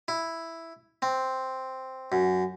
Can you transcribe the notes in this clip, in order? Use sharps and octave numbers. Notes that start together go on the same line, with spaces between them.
E4
C4
F#2